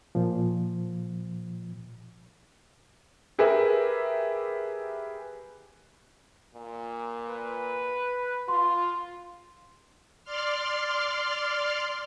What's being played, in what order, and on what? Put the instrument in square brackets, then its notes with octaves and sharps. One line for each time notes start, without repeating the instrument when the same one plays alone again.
[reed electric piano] A#2 F3
[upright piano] G4 G#4 A#4 B4 E5
[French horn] A#2
[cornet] B4
[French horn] F4 [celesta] C6
[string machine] D5 C6 F6